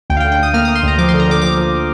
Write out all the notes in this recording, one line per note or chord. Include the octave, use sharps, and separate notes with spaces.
D2 G5
F5
G5
D3
G5
D2 D#6
A#3 F6
D#6
A#3
C6
D2 A#5
F3 D6
C6
D3
A#5
D3 D6
F3 D6
F3